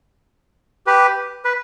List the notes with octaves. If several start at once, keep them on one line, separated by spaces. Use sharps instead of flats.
G4 B4
B4